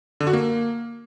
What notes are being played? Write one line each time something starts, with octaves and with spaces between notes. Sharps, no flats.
D3
F#4
A#3